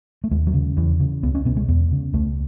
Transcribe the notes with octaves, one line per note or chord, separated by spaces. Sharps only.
A3
D#2 G#3
F#3
C#3
E2 E3
C#3
C#2 B3
C#4
B2 B3
G#3
E2 B3
C#3
C#2 A3